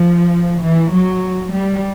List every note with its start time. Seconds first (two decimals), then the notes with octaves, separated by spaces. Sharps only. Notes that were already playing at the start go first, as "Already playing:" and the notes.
Already playing: F3
0.64 E3
0.94 F#3
1.53 G3